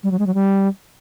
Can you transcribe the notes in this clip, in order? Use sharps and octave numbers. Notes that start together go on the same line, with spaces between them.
G3
F#3
G#3
F#3
G3